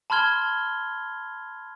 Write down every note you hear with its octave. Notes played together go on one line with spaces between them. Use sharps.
A5 B5 C6 F6 G#6 G7